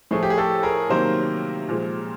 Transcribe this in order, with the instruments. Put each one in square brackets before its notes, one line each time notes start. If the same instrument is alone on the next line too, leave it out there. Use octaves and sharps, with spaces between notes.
[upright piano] A2 F3 A3 [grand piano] G#4
[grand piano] G4
G#4
G4 A4
G#4 A#4
[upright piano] C3 D#3 F#3 A#3 [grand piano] A#4 C5
[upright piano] A#2 F3 G#3